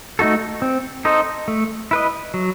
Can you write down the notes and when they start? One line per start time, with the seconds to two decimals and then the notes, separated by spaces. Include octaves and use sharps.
0.19 A3 D#4 F#4 A4
0.62 C4
1.05 D#4 A4 C5 D#5
1.48 A3
1.91 E4 B4 D#5
2.34 F#3